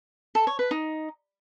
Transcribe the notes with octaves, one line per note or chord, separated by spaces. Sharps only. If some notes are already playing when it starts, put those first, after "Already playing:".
A4
C#5
B4
D#4